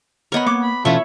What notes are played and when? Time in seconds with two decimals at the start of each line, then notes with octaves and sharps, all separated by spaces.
0.32 B3 A#4 C#5 D#5 B5
0.46 A#3 F#5 D6
0.63 B5
0.85 B2 E3 A3 C#4 E4 F4 C#5 E5